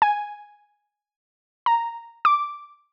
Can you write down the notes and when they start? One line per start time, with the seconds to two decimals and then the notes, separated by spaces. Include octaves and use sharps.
0.02 G#5
1.66 A#5
2.25 D6